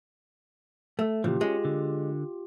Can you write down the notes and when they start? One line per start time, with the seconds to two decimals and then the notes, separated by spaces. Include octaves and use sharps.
0.99 A3
1.24 A#2 C#3 E3 F3 F4 G4
1.41 G#3 C#4
1.65 D3